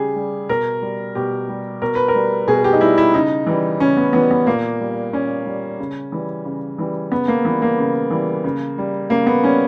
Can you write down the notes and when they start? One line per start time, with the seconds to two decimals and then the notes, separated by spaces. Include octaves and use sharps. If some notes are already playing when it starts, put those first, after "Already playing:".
Already playing: C#3 G3 G4 G#4
0.15 G3
0.49 B2 A#4
0.82 G3
1.15 B2 G4
1.48 G3
1.82 B2 A#4
1.95 B4
2.08 A#4
2.15 G3
2.47 B2 G#4
2.64 G4
2.73 D#4
2.81 G3 E4
2.98 E4
3.14 C#3 D#4
3.47 E3 G3
3.80 C#3 C#4
3.97 B3
4.13 E3 G3 B3
4.31 B3
4.47 A#2 A#3
4.80 G3
5.13 A#2 C#4
5.46 G3
5.79 C#3
6.12 E3 G3
6.45 C#3
6.78 E3 G3
7.12 C#3 B3
7.28 A#3
7.45 E3 G3 B3
7.62 A#3
7.78 C#3
8.11 E3 G3
8.44 C#3
8.78 G3
9.10 C#3 A#3
9.27 B3
9.44 G3 C#4